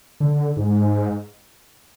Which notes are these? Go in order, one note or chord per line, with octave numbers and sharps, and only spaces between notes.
D3
G#2